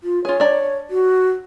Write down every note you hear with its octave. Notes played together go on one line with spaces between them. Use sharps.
F4
F4 G#4 C#5
D4 D5 A#5
F#4